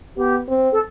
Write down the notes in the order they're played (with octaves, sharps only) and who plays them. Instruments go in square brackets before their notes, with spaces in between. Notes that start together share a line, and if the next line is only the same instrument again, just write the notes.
[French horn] B3 [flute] G4
[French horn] C4
[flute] A4